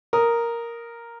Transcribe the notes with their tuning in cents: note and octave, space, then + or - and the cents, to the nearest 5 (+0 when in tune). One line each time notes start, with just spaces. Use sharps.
A#4 +0 D#6 +0